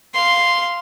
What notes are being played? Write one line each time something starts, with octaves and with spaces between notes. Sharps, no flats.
F5 C6